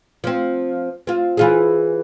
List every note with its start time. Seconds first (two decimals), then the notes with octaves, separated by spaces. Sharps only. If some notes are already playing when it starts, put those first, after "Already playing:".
0.24 F3 C4
1.07 C4 F4
1.37 E3 F4 G#4